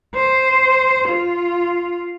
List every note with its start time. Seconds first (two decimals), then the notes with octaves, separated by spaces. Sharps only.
0.15 C5
1.09 F4